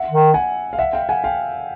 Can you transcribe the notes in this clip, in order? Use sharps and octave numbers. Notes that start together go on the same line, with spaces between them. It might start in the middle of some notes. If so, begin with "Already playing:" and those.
Already playing: E5 F#5
D#3
F#5 G#5
F5
E5 F#5
F5 G5
F#5 G#5
F5 G5